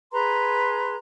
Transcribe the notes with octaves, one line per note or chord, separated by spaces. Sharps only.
G#4 B4 A#5 C6